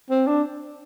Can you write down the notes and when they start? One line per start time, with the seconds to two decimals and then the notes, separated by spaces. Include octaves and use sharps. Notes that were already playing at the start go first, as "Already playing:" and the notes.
0.11 C4
0.27 D4